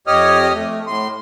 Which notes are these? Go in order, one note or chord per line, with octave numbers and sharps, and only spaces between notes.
F2 G4 C#5 D#5 D#6 F6
A3
A2 C6